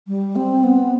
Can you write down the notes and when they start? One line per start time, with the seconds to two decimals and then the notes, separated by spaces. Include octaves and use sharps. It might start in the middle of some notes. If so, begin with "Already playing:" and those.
0.08 G3
0.36 C4
0.64 B3